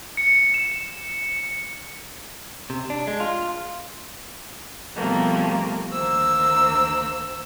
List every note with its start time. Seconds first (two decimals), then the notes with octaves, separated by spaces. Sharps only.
0.17 C#7
0.54 E7
2.70 C3
2.90 D4
3.08 G#3
3.20 F4
4.95 B2 F3 G3 A3 A#3 C4
5.90 D2 D#3 A#3 C5 E6